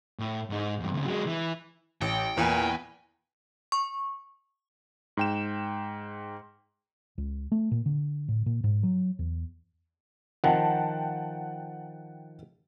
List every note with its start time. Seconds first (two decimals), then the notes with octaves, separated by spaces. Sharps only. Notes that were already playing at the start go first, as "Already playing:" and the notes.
0.19 A2
0.50 G#2 D#4
0.80 E2 G2
0.94 D2 C#3
1.06 F#3 G#3
1.26 E3
2.01 A1 G5
2.37 E2 A#2 B4 G#5
3.72 C#6
5.17 G#2 G5 E7
7.18 C#2
7.52 A3
7.71 A#2
7.86 D3
8.28 A2
8.46 A#2
8.64 G#2
8.83 F#3
9.19 E2
10.44 D#3 F3 F#5 G5 A5